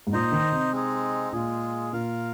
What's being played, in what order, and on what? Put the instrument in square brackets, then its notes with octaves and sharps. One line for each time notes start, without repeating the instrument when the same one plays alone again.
[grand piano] G#2
[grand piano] A#2 [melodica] D#4 C5 D#5
[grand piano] D#3
C3
[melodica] G#3 C4 D#4 G#4
[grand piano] A#2 [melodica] G#3 F4 G#4
[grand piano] A#2 [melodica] F4 A#4 F5